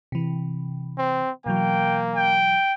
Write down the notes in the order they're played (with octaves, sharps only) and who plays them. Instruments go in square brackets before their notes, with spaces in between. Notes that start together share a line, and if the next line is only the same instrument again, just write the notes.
[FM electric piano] C3 E3
[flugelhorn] C4
[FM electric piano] B2 E3 F#3 [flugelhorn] A#3 [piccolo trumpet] G5
[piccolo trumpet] G5